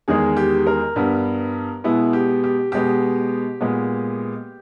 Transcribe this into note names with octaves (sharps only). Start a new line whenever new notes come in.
E2 D#3 G#3 G#4
G4
A#4
G2 G3 B3
B2 G#3 B3 E4
G4
G4
B2 G#3 B3 G4
A#2 G#3 B3